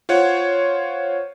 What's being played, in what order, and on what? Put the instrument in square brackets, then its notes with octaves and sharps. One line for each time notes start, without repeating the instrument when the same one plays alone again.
[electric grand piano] F4 C5 C#5 F#5